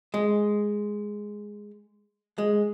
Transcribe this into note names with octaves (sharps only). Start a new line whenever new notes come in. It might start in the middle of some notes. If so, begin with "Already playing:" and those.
G#3
G#3